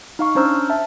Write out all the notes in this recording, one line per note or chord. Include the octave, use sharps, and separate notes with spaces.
D#4 F5 C#6
C#4 D4 C5 A#5 E6 F6
E5 A5